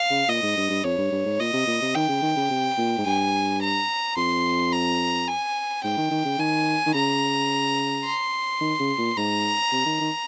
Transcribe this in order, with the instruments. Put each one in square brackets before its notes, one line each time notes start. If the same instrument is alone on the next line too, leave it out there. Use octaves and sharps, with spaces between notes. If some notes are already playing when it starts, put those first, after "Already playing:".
Already playing: [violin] F5
[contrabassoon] C#3
[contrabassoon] A#2 [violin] D#5
[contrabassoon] G#2
G2
G2
[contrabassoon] F2 [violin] C#5
[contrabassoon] G2
G2
G#2
[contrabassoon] A#2 [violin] D#5
[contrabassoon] C3
A#2
C3
[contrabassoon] D#3 [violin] G5
[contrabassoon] C#3
D#3
C#3
C3
A#2
G#2
[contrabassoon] G2 [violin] G#5
[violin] A#5
[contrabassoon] F2 [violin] C6
[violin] A#5
G#5
[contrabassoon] G#2 [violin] G5
[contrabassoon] D#3
D#3
C#3
[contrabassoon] D#3 [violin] G#5
[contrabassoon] D#3
[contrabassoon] C#3 [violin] A#5
[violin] C6
[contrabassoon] D#3
C#3
A#2
[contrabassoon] G#2 [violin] A#5
[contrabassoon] C3
D#3
D#3